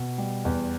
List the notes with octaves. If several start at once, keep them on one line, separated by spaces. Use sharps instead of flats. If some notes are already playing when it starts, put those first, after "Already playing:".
Already playing: B2
G3
E2